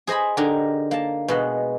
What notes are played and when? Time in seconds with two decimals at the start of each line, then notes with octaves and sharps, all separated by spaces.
0.07 G#4 C5 D#5 G#5 B5
0.37 D3 D#4 G4 A#4 G#5
0.91 A#3 A5
1.28 B2 G#3 F#5